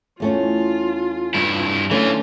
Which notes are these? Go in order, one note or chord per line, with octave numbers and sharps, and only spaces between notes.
E2 A3 C#4 F4
G2 E4
D3 E3 A3 C#4 F4